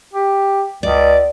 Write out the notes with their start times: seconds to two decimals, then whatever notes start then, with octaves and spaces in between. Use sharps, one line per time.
0.13 G4
0.83 C#2 D5